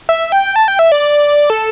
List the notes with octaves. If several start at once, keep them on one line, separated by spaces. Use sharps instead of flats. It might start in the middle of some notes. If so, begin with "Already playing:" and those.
E5
G5
A5
G5
E5
D5
A4